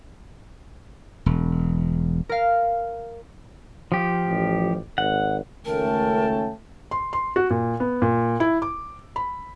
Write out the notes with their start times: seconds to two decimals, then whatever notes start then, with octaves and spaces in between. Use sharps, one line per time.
1.26 E1
2.29 A#4 F5
3.92 F3 G4
4.27 A1
4.98 G#1 F#5
5.65 C#2 D#3 A3 C#4 A#4 G5 A5
6.91 C6
7.13 C6
7.36 F#4
7.50 A#2
7.80 B3
8.02 A#2
8.40 E4
8.62 D6
9.16 B5